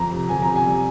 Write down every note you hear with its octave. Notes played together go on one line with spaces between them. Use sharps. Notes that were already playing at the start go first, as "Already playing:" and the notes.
Already playing: F2 A#5
C3
F2 G#5
A#5
C3
G#5
G3